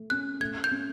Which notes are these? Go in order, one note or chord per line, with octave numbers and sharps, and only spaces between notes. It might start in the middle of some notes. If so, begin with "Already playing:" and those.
Already playing: A3
C#4 F#6
A3 G#6
G6
C#4